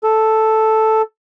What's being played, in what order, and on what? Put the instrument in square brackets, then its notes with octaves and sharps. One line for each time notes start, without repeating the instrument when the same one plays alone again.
[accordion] A4